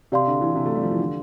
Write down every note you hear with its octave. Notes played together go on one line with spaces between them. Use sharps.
C3 G4 D5 F5 C6
D3
E3
C3
A3
G3
F3
E3
D3